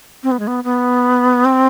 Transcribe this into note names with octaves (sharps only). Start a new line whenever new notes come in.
C4
B3
G#3
B3
B3
C4